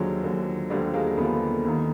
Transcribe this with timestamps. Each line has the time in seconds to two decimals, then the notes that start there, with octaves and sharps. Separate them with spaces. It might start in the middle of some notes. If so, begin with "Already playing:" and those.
Already playing: D#2 D3 F3 F#3 G#3
0.24 D#2 D3 F3
0.70 D#2 D3 F3 G3 A3
0.94 G#3 A#3
1.17 D#2 D3 F3 A3 B3
1.65 D#2 D#3